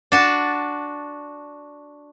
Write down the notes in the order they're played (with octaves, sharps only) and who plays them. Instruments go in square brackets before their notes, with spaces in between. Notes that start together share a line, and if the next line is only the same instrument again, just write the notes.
[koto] D4 F#4 A5